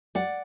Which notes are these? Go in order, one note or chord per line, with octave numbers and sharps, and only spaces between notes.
D5 F#5